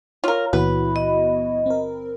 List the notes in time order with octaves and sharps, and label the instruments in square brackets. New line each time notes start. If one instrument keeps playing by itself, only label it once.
[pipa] F4 A#4 [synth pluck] C#5
[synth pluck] C#2 A#2 E3 [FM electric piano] B3 E4 F#4 [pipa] B4
[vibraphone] D#5
[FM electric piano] C4 A#4